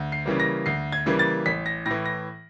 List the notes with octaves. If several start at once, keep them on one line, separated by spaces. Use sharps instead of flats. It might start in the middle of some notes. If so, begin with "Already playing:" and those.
Already playing: D2
C7
C#3 E3 G3 A#3
A#6
D2 C7
G#6
C#3 E3 G3 A#3
A6
A1 B6
A#6
A2 E3 A#6
A#6